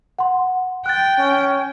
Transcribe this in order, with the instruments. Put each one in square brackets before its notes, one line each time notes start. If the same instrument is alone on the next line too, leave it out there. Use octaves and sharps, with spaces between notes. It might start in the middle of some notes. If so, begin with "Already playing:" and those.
[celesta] F#5 C6
[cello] G5 [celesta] F#6 A6
[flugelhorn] C#4